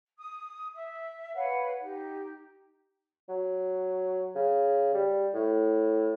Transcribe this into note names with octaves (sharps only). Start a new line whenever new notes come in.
D#6
E5
B4 C#5 F5 F#5
D#4 G4
F#3
C#3
G3
A2